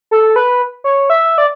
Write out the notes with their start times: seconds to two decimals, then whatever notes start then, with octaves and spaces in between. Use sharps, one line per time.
0.11 A4
0.36 B4
0.84 C#5
1.10 E5
1.38 D5